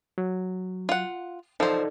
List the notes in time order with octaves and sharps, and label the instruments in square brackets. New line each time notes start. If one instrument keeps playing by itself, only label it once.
[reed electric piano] F#3
[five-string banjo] F4 F#5
[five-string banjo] F3 C5 [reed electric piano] D#4 A4 D5